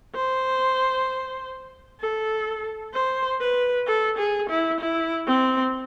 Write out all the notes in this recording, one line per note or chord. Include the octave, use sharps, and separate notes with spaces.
C5
A4
C5
B4
A4
G#4
E4
E4
C4